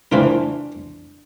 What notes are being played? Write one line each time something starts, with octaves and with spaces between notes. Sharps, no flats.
E3 A3 C4 D4 E4 F4 A#4